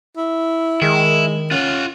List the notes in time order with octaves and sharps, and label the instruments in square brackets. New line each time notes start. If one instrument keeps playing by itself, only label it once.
[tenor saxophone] E4
[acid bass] D#3 [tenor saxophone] G#3 [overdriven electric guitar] E4
[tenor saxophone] C#4 [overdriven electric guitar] F4 F#5